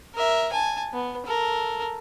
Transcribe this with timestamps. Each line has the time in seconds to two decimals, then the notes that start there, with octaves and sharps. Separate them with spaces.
0.15 A#4 E5
0.52 G#5 A5
0.93 B3
1.26 A4 A#4